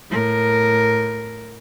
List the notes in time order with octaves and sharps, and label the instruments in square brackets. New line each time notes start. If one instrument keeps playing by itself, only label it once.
[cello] A2 A#4